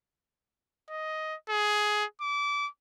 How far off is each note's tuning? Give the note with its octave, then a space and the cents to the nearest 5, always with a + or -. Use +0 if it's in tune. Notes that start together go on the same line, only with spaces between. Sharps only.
D#5 +10
G#4 +15
D6 -25